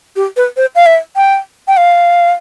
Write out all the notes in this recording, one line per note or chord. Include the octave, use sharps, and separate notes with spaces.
G4
B4
C5
F5
E5
G5
G5
F5